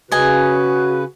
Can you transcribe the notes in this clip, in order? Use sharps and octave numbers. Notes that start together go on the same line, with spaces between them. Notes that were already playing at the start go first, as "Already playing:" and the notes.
C#3 F#4 B4 D#5 G#5